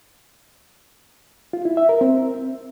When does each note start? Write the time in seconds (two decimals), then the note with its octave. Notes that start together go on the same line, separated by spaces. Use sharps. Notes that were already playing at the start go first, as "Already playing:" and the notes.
1.53 F4
1.65 E4
1.77 E5
1.89 A#4
2.01 C4